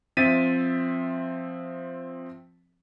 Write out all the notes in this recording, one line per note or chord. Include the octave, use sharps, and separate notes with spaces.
F3 C4 E5 A6 B6 D#7